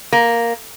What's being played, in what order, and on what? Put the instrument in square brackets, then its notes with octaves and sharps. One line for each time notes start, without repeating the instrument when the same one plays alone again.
[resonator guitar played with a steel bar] A#3